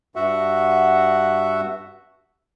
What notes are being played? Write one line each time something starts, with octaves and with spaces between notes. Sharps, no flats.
G2 F#4 E5 F#5